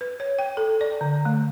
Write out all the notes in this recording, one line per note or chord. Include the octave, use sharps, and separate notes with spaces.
B4
C#5
G5
A4
D5
D3
A3